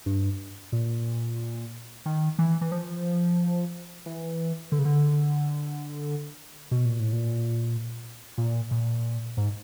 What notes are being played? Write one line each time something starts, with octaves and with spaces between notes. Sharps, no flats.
G2
A#2
D#3
E3
E3
F3
E3
D3
C#3
D3
B2
A#2
A2
A#2
A#2
A#2
G#2